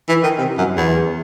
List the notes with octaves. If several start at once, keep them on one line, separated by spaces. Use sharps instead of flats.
E3
D#3
C3
F#2
E2